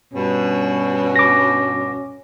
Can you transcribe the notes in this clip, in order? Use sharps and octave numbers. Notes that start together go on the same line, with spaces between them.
G2 B2 C#4
D6 A#6